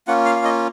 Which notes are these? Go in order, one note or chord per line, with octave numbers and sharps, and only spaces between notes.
A#3 C#4 F4 F#5
F5
F5
D#5